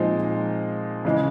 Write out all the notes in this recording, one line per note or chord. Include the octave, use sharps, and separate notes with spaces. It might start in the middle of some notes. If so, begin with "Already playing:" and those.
Already playing: A#2 F3 G#3 C4 D#4
C#3 E3 G#3